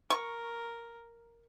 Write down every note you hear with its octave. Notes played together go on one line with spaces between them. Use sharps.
A#4 C#6